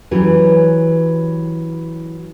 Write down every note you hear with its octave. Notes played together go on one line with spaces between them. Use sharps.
E3 F#3 C#4 G4 B4